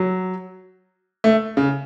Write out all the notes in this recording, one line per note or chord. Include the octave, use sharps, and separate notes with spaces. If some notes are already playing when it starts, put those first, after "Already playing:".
Already playing: F#3
A3
C#3